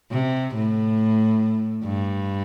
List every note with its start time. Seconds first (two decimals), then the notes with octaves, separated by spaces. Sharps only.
0.11 C3
0.55 A2
1.84 G2